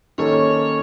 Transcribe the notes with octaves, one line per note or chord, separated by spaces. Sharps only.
D#3 A#3 C#4 A4 C#5